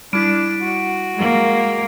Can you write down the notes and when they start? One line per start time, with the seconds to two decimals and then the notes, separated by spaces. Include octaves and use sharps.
0.13 G3 D4 E4 B6 D7
0.62 F#4
1.14 G#3 A#3